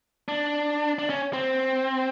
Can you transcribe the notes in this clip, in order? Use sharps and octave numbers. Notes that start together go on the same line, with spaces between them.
D4
D4
C#4
C4